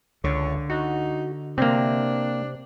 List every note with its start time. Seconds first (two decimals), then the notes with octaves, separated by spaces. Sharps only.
0.24 C#2 D3 C#5
0.70 D#4 F#4
1.58 C3 A#3 C4 D4